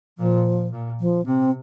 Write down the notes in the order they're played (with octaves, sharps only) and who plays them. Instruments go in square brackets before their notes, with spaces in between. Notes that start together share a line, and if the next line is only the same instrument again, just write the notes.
[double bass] A#2 [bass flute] F3
[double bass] A#2
[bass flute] F3
[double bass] C3 [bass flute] C4